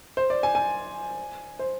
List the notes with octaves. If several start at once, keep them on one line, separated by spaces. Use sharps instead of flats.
C5
D5
G#5
G#5
C5